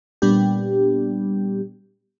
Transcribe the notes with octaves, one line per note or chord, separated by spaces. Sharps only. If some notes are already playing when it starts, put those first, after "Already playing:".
A#2 G3 B3 D4 G4